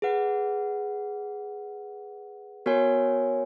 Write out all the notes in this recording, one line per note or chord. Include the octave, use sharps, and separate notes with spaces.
G#4 B4 F#5
B3 F#4 A#4 C#5 G#5